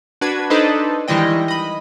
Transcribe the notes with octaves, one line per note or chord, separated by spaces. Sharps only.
D4 F#4 B4 G#6
D4 D#4 A4 B4 C5 D#5
D#3 E3 G3 G#3 D#5 G5
D#5 B5